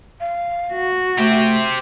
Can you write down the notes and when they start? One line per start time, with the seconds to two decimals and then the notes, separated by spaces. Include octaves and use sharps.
0.20 F5
0.73 F#4
1.18 A3 G4 C5 E5